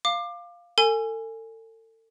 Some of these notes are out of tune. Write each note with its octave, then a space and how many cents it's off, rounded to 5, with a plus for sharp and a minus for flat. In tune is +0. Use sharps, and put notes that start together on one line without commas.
F5 +0 D6 +25
A4 +35 G#5 +0